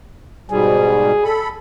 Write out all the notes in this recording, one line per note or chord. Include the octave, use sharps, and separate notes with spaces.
G#2 B2 G3 G#4
A4 B5